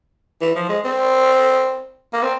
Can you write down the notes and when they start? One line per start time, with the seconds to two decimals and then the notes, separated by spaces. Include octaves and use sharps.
0.41 E3
0.55 F3
0.69 G#3
0.84 C4
2.13 A#3
2.23 C4